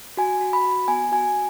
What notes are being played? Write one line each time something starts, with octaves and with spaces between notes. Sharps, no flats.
F#4 G#5
F#4
B5
F#4
B3 G#5
F#4 G#5